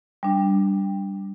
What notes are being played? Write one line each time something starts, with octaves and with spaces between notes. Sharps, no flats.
G3 D4